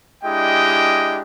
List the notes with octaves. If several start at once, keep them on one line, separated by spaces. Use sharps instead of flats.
G#3 D4 E4 G4 D#5 G5